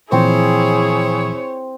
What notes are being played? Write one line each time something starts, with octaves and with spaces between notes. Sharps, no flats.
A#2 E3 F3 C4 E4 G#4 C5 C#5